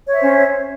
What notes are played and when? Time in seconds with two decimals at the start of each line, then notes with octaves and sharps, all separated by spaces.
0.07 C#5
0.12 E5
0.17 C5
0.22 C#4